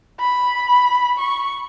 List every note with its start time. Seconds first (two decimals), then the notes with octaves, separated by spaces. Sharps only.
0.20 B5
1.19 C#6